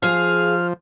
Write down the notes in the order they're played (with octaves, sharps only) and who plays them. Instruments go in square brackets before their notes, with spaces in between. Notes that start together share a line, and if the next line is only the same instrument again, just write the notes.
[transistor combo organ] F3 [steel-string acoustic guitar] G#4 F5 [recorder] F6